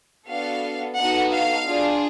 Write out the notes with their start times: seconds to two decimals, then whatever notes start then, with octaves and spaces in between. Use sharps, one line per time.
0.28 B3 D4 F#4 A4 F5
0.98 B3 D#4 F#4 A4 F#5
1.32 F5
1.67 D4 F4 G#4